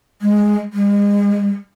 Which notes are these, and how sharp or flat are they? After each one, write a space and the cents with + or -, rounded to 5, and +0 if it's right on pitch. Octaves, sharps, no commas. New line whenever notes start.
G#3 +0
G#3 -40